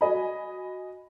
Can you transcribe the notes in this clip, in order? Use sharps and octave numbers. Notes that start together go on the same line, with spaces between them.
F#4 D#5 G#5 B5